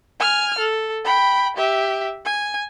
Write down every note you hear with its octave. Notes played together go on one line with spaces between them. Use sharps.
G#5 F6
A4
G5 B5
G4 E5
G#5